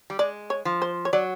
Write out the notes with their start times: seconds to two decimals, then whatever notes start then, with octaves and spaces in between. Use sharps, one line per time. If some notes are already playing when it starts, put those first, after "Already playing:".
0.10 G3
0.19 G#3 D5
0.50 C#5
0.65 F3
0.82 C5
1.05 C#5
1.13 F#3 D5